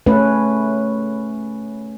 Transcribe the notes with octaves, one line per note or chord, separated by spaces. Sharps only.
A3 C#4 B4